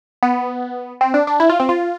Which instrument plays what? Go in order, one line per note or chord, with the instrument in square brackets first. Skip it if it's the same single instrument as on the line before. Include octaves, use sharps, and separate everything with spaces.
[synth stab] B3
C4
D4
D4
E4
F4
C4
F4